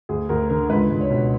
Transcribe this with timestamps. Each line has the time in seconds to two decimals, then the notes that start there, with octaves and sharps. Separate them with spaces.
0.09 D2 G#4
0.29 D2 A#4
0.50 D3 A#4
0.69 C#2 B4
0.90 C#2
1.01 C#5
1.10 B2